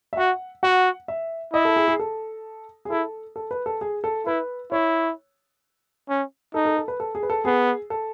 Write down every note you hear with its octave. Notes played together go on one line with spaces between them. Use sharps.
E5
F#4 F#5
F#4 F#5
E5
E4 D#5
A4
G#4
G#4
A4
G#4
E4 A4
A4
B4
A4
G#4
A4
E4 B4
E4 C#5
C#4
D#4 A4
A4
A4
B4
A4
G#4
B4
A4
B3 G#4
A4